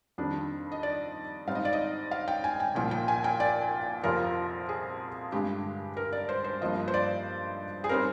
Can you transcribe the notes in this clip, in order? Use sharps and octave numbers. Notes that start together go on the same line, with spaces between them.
F2 D#3 G3 D4
D#5
D5
G#2 G3 C4 D#4 F5
D#5
D5
D#5
F5
G5
G#5
G5
C2 A#2 F3 A#3 G5
G5
G#5
G5
D5
F2 C3 F3 C4 F4 A#4
G#4
G2 D3 G#3 G4
A#4
D5
C5
C5
G2 F3 A#3 F4 D#5
C5
D5
G#4
G3 C4 D#4 A#4